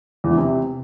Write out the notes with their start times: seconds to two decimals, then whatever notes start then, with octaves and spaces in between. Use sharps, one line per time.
0.24 E2
0.31 E3
0.38 C3